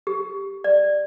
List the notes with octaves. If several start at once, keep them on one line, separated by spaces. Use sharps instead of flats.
G4
D5